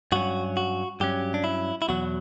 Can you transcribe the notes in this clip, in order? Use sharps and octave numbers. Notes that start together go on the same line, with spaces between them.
G2 F#3 C#4 F#4
F#4
G2 F#3 C#4 G4
D4
E4
E4
E2 B2 F#3 F#4